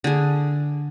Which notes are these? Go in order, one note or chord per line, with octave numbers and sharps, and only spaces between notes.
D3 G#4